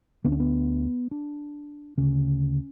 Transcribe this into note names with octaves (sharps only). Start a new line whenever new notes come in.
D2 D3 B3
C#4
B3
D4
D2 C#3 C#4